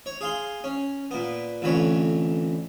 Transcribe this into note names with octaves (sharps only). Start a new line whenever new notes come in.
C#5
G#4 F5 C6
C#4
A#2 B3
A1 F2 D3 B4 C#5